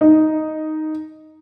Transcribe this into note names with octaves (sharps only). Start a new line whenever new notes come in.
D#4